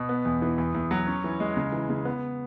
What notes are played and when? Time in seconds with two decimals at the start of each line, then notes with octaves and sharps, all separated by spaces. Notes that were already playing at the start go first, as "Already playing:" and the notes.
Already playing: B2
0.09 B3
0.25 E2
0.42 E3
0.58 E2
0.75 E2
0.91 F#3
1.07 C#4
1.24 E3
1.40 G#3
1.57 C#3
1.72 E3
1.89 C#3
2.05 B3